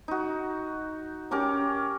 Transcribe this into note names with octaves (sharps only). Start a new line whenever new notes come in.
D#4 F#4
C#4 G4 A#4 D6